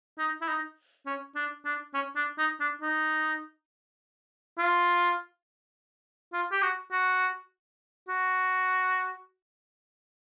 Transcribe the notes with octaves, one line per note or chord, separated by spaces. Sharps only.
D#4
E4
D#4
C#4
D4
D4
C#4
D4
D#4
D4
D#4
F4
F4
G4
F#4
F#4
F#4